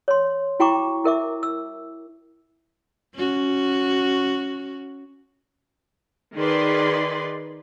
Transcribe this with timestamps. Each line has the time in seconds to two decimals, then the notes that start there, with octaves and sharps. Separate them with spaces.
0.08 C#5 C6
0.60 E4 F#4 G5 A#5 C#6 D6
1.04 E4 A#4 E5 D6
1.43 E6
3.15 C#4 F#4
6.35 D#3 D#4 G#4 B4 D5 C6